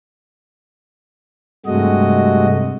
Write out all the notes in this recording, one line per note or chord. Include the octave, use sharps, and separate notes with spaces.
G2 C3 G#3 A3 F#4 D#5